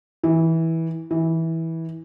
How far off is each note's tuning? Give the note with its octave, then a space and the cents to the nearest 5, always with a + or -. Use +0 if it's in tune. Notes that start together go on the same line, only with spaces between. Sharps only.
E3 -15
E3 -15